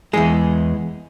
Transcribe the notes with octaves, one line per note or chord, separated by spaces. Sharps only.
E2 E3 G#3 G#4